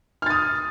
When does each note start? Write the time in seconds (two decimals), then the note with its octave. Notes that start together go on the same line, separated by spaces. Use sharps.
0.22 F6
0.26 A6
0.30 D#6